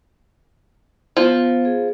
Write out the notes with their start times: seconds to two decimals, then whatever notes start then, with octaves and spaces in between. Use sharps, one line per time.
1.17 F3 B3
1.65 G#4